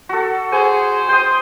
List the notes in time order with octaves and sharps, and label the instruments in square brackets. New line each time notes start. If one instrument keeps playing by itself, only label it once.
[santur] F#4 A4
[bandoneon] G#4 [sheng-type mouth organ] C5 [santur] G#5
[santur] G5 D#6 [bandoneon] C6